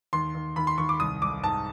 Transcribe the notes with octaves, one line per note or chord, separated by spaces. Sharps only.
D#2 C6
D#2
D#2 B5
C6
D#2 C#6
D6
C2 D#6
C2 D6
G#2 A5